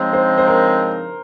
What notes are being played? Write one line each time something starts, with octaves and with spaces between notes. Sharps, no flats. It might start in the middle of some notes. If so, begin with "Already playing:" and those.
Already playing: C#3 F3 G#3 C4 D#4 C5
C5
C5
A#4